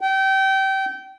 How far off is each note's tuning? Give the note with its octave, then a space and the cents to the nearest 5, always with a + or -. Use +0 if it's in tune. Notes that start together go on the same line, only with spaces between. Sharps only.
G5 -25